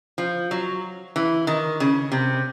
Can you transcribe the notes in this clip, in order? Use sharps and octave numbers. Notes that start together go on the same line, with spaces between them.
F3
F#3
E3
D#3
C#3
C3